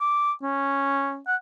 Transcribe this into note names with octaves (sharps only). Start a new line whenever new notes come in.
D6
C#4
F#5